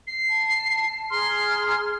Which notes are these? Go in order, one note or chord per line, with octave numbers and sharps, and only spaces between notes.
C7
A5
G#4 A#5 C6 F6